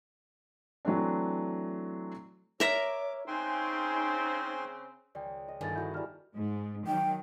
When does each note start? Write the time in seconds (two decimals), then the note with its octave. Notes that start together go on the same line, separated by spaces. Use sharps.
0.85 E3 F#3 A3 C4 D4
2.60 A#4 C#5 E5 A#5 D6
3.28 C#3 C4 D#4 G5 G#5 C6
5.15 C#2 D5 G5
5.48 D#5
5.61 G1 G2 B2 D#3 G#4 G#5 A6
5.75 E4 F#4 F#5 G6
5.94 G3 E4 A5 F6
6.36 G#2
6.87 D#3 F#3 G5